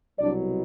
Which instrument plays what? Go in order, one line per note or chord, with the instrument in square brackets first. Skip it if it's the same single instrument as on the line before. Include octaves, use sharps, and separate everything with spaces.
[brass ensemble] C2 B2 F#3 D4 D5